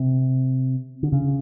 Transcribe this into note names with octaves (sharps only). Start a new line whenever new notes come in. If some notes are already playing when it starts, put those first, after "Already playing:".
Already playing: C3
D3
C#3